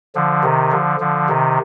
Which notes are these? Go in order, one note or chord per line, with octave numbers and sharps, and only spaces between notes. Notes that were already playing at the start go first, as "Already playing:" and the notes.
D3 F3
C3 D#3
D3 F3
D3 F3
C3 D#3